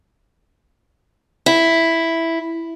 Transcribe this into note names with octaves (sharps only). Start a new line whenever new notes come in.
E4